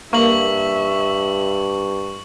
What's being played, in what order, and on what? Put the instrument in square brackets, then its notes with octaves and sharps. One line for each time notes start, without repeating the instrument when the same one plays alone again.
[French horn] G2 [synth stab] A#3 [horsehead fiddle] E5 [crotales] C#6 F#7